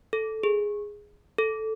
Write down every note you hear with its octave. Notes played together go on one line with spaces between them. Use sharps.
A4
G#4
A4